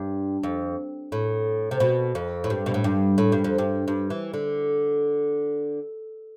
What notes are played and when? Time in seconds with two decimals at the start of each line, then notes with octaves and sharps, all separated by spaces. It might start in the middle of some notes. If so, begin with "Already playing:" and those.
Already playing: G2
0.43 F2
1.12 A2
1.71 C3
1.80 B2
2.15 F2
2.44 A2
2.50 G2
2.66 B2
2.74 A2
2.84 G2
3.18 A2
3.32 G2
3.44 F2
3.58 G2
3.88 G2
4.10 E3
4.34 D3